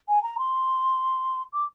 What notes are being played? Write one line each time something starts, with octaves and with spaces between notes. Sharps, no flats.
G#5
A#5
C6
D6